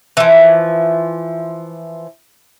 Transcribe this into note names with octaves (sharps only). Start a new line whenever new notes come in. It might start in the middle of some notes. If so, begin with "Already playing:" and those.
E3 F3